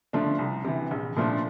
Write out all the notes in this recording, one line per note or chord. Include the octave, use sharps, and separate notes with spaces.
D3 F3 A3 D4
C2
C3 E3
A#1
A#2 F3 A3 D4